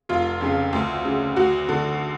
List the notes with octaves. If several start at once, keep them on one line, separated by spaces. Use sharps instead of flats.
F1 F4
F2 C#3
D2
C#3
D2 F#4
D3